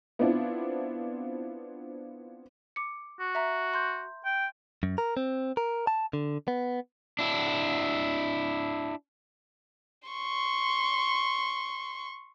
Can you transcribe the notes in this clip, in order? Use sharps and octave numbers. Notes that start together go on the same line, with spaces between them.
B3 C4 D4 E4 F4
D6 C#7
F#4
E5 A#5
C6 G6
G5
F#2
A#4
C4
A#4
A5
D3
B3
D4 E4
C6 C#6